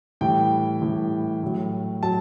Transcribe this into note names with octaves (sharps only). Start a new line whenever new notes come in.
A2 E3 G3 G5
A2 E3 G3
A2 F#3
F#3 A5